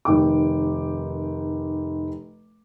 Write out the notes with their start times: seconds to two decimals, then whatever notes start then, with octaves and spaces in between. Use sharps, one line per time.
0.05 F1 D#3 G5 D6